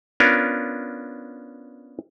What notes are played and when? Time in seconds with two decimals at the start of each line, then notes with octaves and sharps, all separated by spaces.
0.20 B3 C#4 D4 F4 A#4